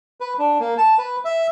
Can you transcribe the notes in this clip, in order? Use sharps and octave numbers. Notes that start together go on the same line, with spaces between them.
B4
D4
A#3
A5
B4
E5